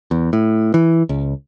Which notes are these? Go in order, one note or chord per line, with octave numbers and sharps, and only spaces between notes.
E2
A2
E3
C#2